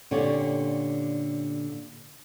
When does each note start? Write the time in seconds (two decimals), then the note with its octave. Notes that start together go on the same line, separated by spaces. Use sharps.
0.11 A#2 D3 C#4 G4 C#5 D5